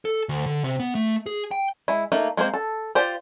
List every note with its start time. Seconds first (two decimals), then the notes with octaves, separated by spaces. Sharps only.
0.05 A4
0.29 D2
0.46 D3
0.64 C3
0.80 B3
0.95 A3
1.26 G#4
1.51 G5
1.88 G#3 E4
2.12 A3 A#3 D#4
2.37 G#3 A#3 C4 C5
2.54 A4
2.95 F4 G4 C5 D5